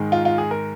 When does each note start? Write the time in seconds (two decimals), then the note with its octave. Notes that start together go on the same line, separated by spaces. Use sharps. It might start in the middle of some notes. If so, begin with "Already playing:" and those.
Already playing: G#2 D#3 G#3
0.12 F4
0.25 F4
0.38 G#4
0.51 A#4